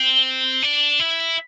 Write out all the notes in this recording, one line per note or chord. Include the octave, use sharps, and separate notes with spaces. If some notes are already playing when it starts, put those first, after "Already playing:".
Already playing: C4
D4
E4